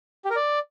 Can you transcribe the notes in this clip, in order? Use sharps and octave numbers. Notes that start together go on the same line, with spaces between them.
G4
A#4
D5